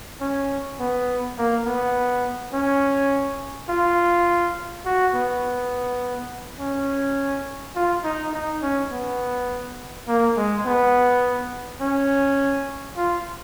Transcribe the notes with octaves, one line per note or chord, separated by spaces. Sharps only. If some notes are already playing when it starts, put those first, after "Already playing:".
C#4
B3
A#3
B3
C#4
F4
F#4
B3
C#4
F4
D#4
D#4
C#4
B3
A#3
G#3
B3
C#4
F4